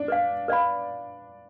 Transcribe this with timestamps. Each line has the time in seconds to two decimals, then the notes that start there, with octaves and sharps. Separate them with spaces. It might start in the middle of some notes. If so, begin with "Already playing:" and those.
Already playing: D4
0.08 B4 D5 F5
0.48 B4 D5 F5 B5